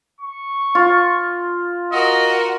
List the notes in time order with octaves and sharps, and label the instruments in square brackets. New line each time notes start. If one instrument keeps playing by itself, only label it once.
[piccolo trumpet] C#6
[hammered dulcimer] F4
[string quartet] F#4 A#4 [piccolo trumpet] D#5